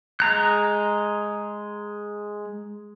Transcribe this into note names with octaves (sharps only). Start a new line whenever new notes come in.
G#3 A#5 F#6